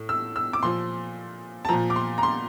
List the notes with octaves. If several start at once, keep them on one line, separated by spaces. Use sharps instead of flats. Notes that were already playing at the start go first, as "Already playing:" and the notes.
Already playing: A2
E6
E6
D6
A#2 F3 C6
A5
A#2 F3 A#5
D6
C6
A#5
C6